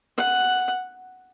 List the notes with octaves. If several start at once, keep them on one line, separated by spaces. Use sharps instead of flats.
F#5